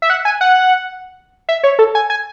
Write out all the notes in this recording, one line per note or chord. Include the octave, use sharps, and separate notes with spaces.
E5
F#5
G#5
F#5
E5
C#5
A4
G#5
G#5